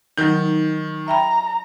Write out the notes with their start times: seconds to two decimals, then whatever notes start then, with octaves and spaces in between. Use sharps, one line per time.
0.18 D#3 F#3 D#4 G6
1.08 E5 G5 A#5 B5